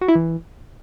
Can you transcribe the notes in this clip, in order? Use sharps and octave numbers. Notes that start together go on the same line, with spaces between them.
F#4
E4
E3